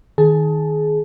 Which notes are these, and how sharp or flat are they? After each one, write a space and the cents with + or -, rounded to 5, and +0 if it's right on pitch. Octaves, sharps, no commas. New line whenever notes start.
D#3 +0 G#4 +20 A5 +0